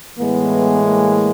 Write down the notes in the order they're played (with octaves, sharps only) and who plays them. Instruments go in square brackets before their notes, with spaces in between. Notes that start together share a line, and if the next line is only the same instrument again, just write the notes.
[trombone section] A2 E3 G#3 [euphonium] B3
[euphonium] A#3